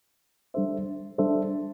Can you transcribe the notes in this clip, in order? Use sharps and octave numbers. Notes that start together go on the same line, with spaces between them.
G3 D4 A4 C5 E5
G3 D4 A4 C5 E5